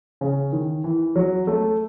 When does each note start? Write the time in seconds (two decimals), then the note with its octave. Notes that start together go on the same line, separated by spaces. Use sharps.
0.21 C#3
0.53 D#3
0.84 E3
1.16 F#3
1.47 A3